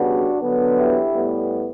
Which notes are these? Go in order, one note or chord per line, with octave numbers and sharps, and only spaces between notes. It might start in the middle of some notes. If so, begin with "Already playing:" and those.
Already playing: C#3 G3 B3 D4 F#4
D3 F#3 B3
E4 G4
A2 G3 B3